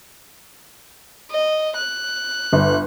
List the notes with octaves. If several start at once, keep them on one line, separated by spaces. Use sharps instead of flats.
D#5
F#6
G1